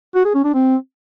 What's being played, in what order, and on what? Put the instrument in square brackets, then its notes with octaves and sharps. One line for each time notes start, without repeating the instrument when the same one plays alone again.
[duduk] F#4
G#4
C#4
D4
C4